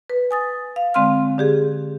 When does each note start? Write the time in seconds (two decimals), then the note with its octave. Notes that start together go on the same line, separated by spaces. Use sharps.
0.10 B4
0.31 G#5 D#6 A6
0.76 F5
0.94 D3 G#3 C4 F5 C6 F6
1.38 D3 G4 G#4